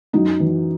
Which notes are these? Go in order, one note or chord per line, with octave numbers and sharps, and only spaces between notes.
F#2 D#4 F#4
E3